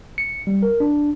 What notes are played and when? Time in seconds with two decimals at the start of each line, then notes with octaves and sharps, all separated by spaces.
0.18 C#7
0.47 G3
0.63 A#4
0.80 D4